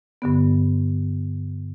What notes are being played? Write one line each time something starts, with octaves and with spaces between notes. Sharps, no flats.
G2 D3 B3